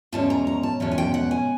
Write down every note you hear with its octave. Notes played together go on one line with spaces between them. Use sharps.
E2 B2 G#3 C#4 A5
A#5
A#5
A5
E2 B2 G#3 C#4
G#5
G5
F#5
G#5